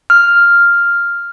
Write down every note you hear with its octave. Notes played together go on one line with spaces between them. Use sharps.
F6